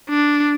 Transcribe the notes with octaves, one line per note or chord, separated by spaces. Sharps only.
D4